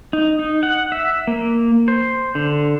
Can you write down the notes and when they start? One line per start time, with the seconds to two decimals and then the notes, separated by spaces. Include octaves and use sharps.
0.13 D#4
0.39 D#4
0.63 F#5
0.92 E5
1.27 A#3
1.88 C5
2.35 D3